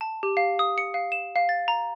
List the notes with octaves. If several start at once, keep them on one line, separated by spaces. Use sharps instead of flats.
A5
G4
F5
D#6
C#7
F5
E7
F5
A6
A#5